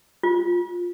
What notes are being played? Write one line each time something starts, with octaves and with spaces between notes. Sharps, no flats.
F4